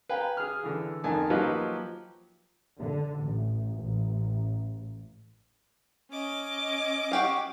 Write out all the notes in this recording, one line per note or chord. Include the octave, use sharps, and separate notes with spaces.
B4 F5 G5 G#5 A#5
G#4 F6
D3 E3
F2 D#3 G#5 A5
F3 F#3 A#3 D#4 G4 B4
D3
A1
A1
C#4 D#5 D6
F#4 G4 F5